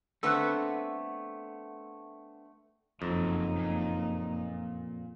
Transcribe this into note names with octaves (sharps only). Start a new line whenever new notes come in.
D3 A3 B3 C4 E6 F#6
F#1 F2 F3 F#3 D#4
A#2